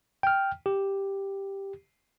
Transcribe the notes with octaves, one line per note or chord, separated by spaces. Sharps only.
G5 F6
G4